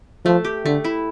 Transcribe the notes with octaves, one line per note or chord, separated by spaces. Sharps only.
F3 A3
G4
D3 A3
E4